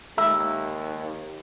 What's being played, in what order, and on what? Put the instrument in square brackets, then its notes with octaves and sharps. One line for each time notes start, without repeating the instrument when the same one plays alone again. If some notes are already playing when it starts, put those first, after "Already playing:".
[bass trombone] D#2 [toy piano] E5 B5 E6